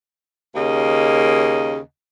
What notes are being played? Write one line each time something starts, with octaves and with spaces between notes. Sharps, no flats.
D#2 C#3 A#3 D#5